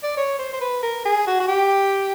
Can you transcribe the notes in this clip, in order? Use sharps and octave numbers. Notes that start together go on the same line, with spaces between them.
D5
C#5
C5
C5
B4
A#4
G#4
F#4
F#4
G4